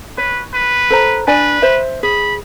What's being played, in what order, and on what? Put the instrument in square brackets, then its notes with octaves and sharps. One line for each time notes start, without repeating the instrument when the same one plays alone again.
[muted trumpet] B4 [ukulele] C#5
[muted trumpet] B4
[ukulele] A4 C5 A#5
[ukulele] D4 D5 G#5 [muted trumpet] B4
[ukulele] C5 E5
[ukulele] G#4 [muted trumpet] B5